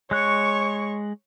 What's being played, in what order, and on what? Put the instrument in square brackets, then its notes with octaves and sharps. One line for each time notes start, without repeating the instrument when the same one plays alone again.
[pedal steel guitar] G#3 F#6 [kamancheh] C#5 C#6